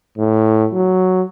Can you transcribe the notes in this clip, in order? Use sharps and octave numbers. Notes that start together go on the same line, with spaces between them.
A2
F#3